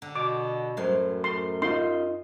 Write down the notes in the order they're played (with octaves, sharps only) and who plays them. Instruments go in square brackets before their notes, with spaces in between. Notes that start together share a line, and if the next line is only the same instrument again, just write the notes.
[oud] D3
[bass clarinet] B2 [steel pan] D6
[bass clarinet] F#2 [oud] A2 F#3 C5
[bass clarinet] F#2 [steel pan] C6
[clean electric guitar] D#4 F4 [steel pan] C6